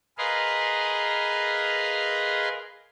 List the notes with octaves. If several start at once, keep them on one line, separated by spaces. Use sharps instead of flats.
G#4 A#4 B4 D#5 F5 C6